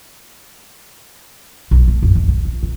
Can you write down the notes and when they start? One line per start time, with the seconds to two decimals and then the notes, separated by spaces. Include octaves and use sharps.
1.71 B1
1.88 A3
2.03 F#2
2.15 D#2
2.28 B1
2.45 C#2
2.63 C3